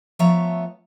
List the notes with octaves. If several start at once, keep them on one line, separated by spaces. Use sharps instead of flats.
F3 A3 B3 C#5 E5 A#5